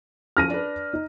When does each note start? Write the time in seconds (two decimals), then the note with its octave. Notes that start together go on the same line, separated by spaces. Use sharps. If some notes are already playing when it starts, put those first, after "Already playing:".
0.37 F#2 F3 F6 A#6 D#7
0.50 D4 B4
0.93 D#4